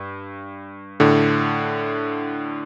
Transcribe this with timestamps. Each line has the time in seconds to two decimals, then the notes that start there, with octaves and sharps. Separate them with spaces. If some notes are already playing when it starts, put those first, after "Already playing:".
Already playing: G2
1.00 A2 D3